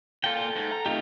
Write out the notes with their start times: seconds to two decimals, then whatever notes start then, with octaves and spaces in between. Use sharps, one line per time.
0.24 A#2 F4 A4 G5
0.56 G#2
0.72 A#5
0.86 A3 C4 D#4 F4 G4